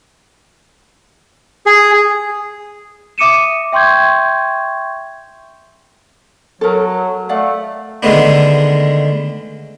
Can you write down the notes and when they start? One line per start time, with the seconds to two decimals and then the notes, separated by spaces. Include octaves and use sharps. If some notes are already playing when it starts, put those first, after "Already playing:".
1.66 G#4
3.18 E5 D6 D#6 C#7 D#7 E7
3.72 E5 G5 C6 C#6 G6 G#6
6.61 F#3 A4 A#4
7.29 A3 D5 F5 F#5
8.03 D3 D#3 G#3 A3 B3 D4